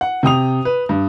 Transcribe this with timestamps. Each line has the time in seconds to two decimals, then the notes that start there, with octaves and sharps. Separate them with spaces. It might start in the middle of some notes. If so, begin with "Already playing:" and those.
0.01 F#5
0.23 C3 G5 D#6 F7
0.65 B4
0.89 G2